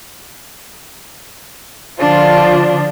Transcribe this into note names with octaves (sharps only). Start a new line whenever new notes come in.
D3 F3 D4 F4